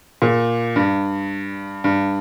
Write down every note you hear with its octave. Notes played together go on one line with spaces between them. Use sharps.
A#2
G2
G2